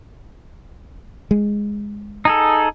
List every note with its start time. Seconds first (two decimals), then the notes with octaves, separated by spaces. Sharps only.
1.31 G#3
2.25 D#4 G#4 A4